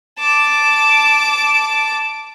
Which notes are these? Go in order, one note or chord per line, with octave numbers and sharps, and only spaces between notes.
A5 D6